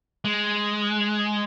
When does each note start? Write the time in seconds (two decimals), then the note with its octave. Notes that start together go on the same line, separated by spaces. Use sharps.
0.25 G#3